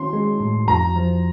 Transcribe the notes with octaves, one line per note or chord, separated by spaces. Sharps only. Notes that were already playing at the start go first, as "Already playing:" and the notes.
Already playing: D#3 C#4 C6
G#3
A2
F2 A#5
F3